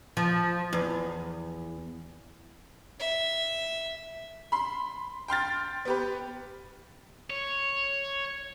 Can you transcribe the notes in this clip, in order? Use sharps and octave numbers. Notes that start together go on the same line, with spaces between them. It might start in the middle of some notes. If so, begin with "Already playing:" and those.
F3
E2
E5
B5 C6
G5 C6 F6 A6
B3 G4 B4
C#5